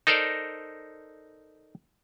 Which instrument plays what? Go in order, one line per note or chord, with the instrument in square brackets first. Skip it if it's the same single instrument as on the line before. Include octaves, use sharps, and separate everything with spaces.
[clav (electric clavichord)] D#4 A4 A#4 C5 D5